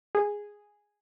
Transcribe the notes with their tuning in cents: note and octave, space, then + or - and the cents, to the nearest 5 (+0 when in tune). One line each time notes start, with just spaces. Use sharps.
G#4 -5